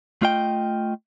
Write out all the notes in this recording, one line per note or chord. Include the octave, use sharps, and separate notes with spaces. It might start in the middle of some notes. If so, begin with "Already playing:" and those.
A3 F4 D#5 G5